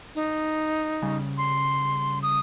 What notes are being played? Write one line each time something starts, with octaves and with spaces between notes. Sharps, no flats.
D#4
C#3 G3
C6
D#6